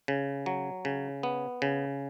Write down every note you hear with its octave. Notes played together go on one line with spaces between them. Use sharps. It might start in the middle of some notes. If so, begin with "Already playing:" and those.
C#3
F#3
C#3
B3
C#3